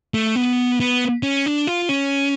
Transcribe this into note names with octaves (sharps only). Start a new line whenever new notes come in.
A3
B3
B3
C#4
D4
F4
C#4